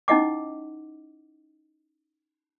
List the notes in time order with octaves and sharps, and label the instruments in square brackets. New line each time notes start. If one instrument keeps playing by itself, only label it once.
[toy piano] C#4 D#4 E4 D#5 F#5 D6